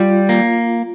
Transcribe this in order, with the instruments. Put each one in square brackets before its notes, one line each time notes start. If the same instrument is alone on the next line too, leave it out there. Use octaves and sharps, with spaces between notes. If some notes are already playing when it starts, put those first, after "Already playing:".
Already playing: [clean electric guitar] G3 [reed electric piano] F4
[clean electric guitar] A#3